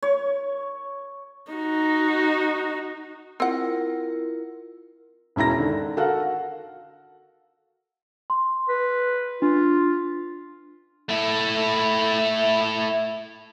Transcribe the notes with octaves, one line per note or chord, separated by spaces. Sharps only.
C#5
D#4 F#4
C4 E4 F4 A#4 F#5
E1 C#4 E4 A#5 A#6
D3 D#3
F#4 A4 A#4 F5 F#5
C6
B4
D4 F4
A3 E4